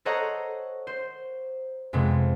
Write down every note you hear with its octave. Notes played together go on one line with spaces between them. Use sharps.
A4 C5 C#5 D#5 F#5 A#5
C5
F2 C3 G#3 B3